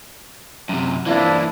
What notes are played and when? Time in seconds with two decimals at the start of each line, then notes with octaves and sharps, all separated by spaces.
0.69 F#2 C3
1.06 E3 F3 A#3 D4 E4